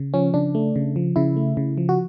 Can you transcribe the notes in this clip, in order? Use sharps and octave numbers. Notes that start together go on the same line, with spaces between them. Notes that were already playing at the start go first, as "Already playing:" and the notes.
Already playing: C#3
F3 C#4
C#3 D4
A3
C#3
F3
C#3 E4
A3
C#3
F3
F#4